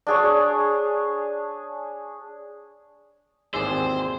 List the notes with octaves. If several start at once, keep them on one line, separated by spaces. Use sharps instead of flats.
D4 G#4 C#5
G#1 D#2 E3 C4 G#4 C5 D5 E6